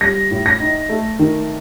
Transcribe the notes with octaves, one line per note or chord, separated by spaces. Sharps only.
G3 A#6
A2
A#6
D#4
A3
D#3